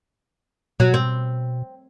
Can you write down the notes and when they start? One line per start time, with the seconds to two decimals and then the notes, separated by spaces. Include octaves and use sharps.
0.80 B2 F#3
0.94 C4